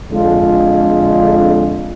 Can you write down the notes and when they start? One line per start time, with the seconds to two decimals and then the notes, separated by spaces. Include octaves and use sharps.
0.10 F2 D3 G#3 D4 F4